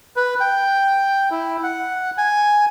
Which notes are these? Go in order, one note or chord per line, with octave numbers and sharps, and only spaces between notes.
B4
G5
E4
F#5
G#5